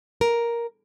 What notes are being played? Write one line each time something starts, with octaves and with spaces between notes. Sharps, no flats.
A#4